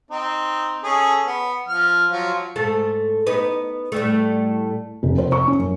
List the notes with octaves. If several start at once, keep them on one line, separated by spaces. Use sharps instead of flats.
C4 D#4
C#4 G#4 A4
B3
F3 F6
F3 F#3 F4
G#2 A3 A4
B3 D#4 B4
A2 G3 A3
F1
C5
C#6
C#4
F#2